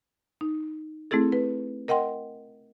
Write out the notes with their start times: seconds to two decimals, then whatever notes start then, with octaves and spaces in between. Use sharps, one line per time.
0.41 D#4
1.11 A3 C4 E4 G#4 A4
1.32 B4
1.88 A#4 D#5 F#5 G5 C6